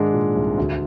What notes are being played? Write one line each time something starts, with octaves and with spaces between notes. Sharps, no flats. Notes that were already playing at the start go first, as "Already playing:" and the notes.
Already playing: G#2 D#3 G#3 D4
A#2
C2
D2